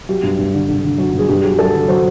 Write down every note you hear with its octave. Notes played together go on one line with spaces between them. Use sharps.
F#3 G4
G2
G2
D3
D3
D3
F#3
G2
G#4
G2 G4
F#3 G#4
F#3 A4
D3
F#3 C5